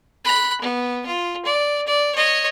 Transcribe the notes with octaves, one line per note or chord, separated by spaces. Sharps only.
B5 F#6
B3
F4
D5
D5
C#5 D#5